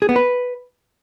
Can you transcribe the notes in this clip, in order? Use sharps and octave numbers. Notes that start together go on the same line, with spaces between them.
G#4
B3
B4